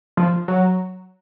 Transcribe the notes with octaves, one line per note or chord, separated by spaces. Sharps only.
F3
F#3